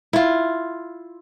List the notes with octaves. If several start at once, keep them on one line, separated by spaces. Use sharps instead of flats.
E4 F4